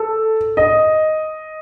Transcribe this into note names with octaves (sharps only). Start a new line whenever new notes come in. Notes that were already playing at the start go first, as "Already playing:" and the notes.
Already playing: A4
D#5